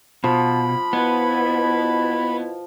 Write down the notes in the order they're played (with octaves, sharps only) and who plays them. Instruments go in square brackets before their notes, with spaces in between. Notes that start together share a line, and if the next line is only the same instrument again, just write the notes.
[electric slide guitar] B2 [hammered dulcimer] F3 [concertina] B5
[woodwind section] B2 E4 [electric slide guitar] B3